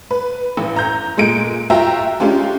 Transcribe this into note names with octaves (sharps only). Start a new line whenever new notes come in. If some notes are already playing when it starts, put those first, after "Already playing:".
B4
A1
A#5 G6
A#2 G#3 A3 D7
F4 F#4 E5 G5 A#5
G#3 C#4 D4 F4 G4